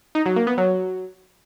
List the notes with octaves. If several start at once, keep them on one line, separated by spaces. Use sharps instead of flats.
D#4
F#3
A#3
B3
F#3